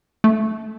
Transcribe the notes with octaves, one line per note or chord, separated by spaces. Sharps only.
A3